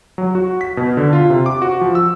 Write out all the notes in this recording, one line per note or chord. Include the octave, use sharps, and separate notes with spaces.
F#3
F#4
B6
B2
D3
F4
C3
D6
F#4
F3
E6